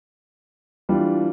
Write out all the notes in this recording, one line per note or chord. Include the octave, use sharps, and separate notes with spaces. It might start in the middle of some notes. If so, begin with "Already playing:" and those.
E3 G3 D4 F4